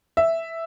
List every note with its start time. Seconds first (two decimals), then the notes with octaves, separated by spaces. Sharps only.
0.17 E5